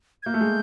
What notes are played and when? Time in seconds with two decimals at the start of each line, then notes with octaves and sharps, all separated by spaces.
0.23 G#6
0.26 A#3 G6
0.34 A3
0.41 G#3